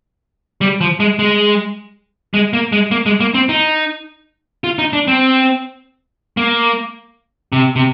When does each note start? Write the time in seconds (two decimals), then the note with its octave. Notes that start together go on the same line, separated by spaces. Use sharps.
0.61 G3
0.81 F3
1.00 G#3
1.19 G#3
2.34 G#3
2.53 A#3
2.72 G#3
2.91 A#3
3.06 G#3
3.20 A#3
3.34 C4
3.49 D#4
4.64 F4
4.79 D#4
4.93 D4
5.08 C4
6.37 A#3
7.53 C3
7.76 C3